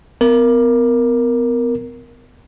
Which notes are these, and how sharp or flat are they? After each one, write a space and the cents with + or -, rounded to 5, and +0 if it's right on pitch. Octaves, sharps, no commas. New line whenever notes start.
B3 +40 A#4 +0